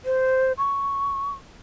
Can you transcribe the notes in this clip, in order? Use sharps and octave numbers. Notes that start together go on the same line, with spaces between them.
C5
C#6